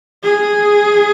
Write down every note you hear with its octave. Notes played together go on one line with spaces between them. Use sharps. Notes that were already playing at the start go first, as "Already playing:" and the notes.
G#4